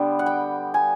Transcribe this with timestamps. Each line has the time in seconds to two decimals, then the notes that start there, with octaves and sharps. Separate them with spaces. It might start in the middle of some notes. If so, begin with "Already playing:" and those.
Already playing: D3 G3 B3 G5
0.19 F#5
0.26 G5
0.74 G#5